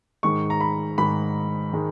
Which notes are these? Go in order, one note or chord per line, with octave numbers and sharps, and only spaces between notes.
G#2 D#3 G#3 C#6
A#5
B5
G#2 D#3 G#3 B5
D#3 G#3